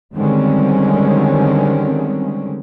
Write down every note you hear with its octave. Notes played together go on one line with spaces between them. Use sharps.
D3 D#3 G3 G#3 C4 C#4